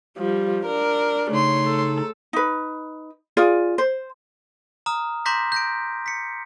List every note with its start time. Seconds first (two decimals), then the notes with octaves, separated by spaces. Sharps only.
0.18 F3 G3
0.66 D4 A#4
1.31 C#3 A3 D#4 C#5 C6
1.66 A4
2.33 D#4 B4
3.37 F4 G#4 D5
3.78 C5
4.86 A#5 D#6 F6
5.26 A#5 C6 D6 G6 A#6 B6
5.52 G6 A#6 D7
6.06 B6 C#7